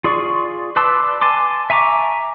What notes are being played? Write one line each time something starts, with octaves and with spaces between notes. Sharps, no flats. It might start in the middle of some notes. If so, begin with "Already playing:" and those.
F4 G#4 D5 C6 C#6
B4 D5 A5 C6 E6
G#5 A5 C6 D6
E5 G#5 A#5 C#6 D6